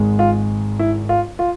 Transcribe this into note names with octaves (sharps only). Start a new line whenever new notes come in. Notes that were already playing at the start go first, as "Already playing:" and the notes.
Already playing: G#1 G#2 G#3
F4
E4
F4
F4